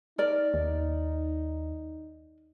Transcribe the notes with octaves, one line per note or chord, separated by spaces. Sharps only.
D#4 A#4 D5
D#2